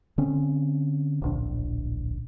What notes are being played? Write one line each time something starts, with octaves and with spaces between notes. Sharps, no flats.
D3 C4 C#4
D1 A#1 D4